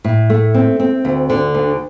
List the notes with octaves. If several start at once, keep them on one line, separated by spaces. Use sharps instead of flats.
A2
A3
C4
C4
D2
D3
D2